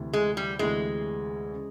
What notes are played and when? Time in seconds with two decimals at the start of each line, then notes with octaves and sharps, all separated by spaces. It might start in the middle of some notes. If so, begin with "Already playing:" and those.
Already playing: D2 C3 E3
0.13 G#3
0.37 G3
0.59 D2 C3 E3 G#3
1.53 C#3